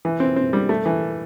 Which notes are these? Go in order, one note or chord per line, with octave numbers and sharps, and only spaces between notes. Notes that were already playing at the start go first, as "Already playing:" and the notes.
E3
C4
C4
G3
A3
E3